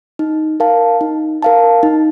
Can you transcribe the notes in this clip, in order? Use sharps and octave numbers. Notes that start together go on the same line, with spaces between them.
D#4
A#4 F5 A5
D#4
A#4 F5 A5
D#4